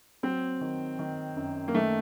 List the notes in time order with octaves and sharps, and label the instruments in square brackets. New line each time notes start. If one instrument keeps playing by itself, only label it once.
[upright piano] F#3 C4
D#3
D#3
F#2
A#3
D#3 A3